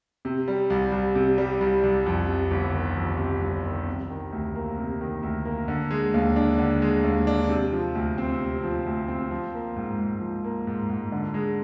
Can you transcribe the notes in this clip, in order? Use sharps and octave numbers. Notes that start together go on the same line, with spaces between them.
C3
G3
C2
C2
C3
G3
C2
C2
F2
C3
G1
D#3
F2
C3
G1
D#3
C3
D#3
D2
A#3
C3
D#3
D2
A#3
D3
G#3
D#2
D4
D3
G#3
D#2
D4
C3
F3
D2
C4
C3
F3
D2
C4
F3
A#3
G#2
G#2
F3
A#3
G#2
G#2
D3
G#3